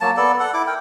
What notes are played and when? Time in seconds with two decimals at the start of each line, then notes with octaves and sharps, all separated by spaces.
0.01 F#3 A#3 A5
0.17 B3 A4 D5
0.40 A4 F#5
0.54 E4 D6
0.67 A#4 G5